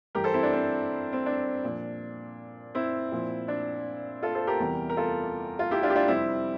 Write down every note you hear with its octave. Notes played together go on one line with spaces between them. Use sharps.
G2 E3 G3 G4 A#4
A4 C5
C4 E4
D4
C4
C4
D4
A#2 F3
C4 E4
A#2 F3
D4
F4 A4
A4 C5
G4 A#4
E2 C3 E3 G3
A#4
F4 A4
F4
E4 G4
D4 F4
G4
D4 F4
F2 C3 G3 C4 E4